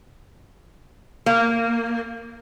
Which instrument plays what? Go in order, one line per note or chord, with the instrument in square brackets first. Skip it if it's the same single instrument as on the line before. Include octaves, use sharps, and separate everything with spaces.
[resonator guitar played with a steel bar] A#3